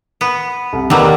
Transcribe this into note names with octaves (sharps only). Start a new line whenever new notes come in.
B3
C2
D#2 D3 D#3 F#3 G4 A#4 B4